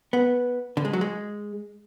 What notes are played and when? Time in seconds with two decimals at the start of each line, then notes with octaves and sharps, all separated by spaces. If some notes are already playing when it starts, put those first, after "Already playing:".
0.13 B3
0.77 D3
0.85 G#3
0.93 F#3
1.01 G#3